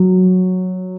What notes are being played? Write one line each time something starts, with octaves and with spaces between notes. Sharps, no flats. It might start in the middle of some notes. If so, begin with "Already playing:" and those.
Already playing: F#3